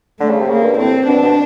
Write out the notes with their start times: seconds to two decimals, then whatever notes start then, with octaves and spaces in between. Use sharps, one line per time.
0.20 D3 A3
0.30 C#3
0.40 C3
0.49 C#3 A#3
0.64 G2
0.78 A2 C4
1.08 B2 D4
1.23 B2